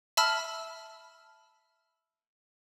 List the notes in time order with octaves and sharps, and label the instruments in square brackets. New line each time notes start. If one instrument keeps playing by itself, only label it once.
[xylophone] E5 A5 B5 E6 F6